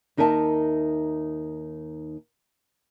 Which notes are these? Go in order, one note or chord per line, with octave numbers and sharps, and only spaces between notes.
D#2 D#4 A#4 E5 G5 A5